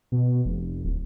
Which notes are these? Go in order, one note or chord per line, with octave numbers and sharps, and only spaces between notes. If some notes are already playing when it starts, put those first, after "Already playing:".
B2
F1
D1